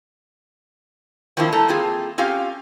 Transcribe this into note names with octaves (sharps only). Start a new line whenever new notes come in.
D#3 F3 A#3 C4 D4 E4
G3 A3 A4 A5 A#5
A#3 C4 F4 G#4
C4 C#4 F4 G4 F5